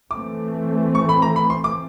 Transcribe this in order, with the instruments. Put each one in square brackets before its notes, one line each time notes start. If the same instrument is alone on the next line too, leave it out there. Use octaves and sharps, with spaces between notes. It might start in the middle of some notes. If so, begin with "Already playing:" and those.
[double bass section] E3 A3 C4 [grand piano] D6
[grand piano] C#6
B5
A#5
B5
C6
D6